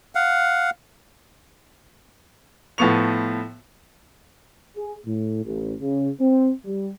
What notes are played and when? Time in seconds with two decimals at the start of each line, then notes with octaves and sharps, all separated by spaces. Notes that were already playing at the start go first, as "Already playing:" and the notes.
0.15 F5 F#5
2.78 A2 F3 B3 C#6 F7
4.77 G#4
5.05 A2
5.45 A1
5.81 C#3
6.20 C4
6.64 G3